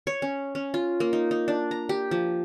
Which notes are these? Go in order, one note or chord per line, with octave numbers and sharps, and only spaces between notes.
C#5
C#4
C#4
F4
A#3
D#4
D#4
D4
A#5
G4
F3